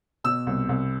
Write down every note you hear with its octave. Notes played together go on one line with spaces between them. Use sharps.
B2 E6
C2
C2